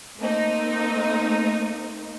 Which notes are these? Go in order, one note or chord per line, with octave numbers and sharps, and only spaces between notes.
A3 A#3 C4 D#4